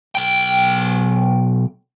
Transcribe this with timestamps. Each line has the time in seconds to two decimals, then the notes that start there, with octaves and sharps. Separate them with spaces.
0.15 B1 G5